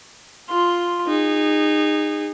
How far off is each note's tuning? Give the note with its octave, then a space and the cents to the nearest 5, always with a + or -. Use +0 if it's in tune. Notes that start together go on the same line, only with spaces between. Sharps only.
F4 +0 C6 +0
D#4 -20 G#4 -30